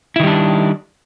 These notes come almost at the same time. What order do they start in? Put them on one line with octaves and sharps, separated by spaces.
E4 D#3 G3 D4